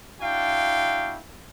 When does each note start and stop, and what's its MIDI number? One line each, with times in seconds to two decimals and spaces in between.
0.21 1.19 62
0.21 1.19 64
0.21 1.19 66
0.21 1.19 77
0.21 1.19 79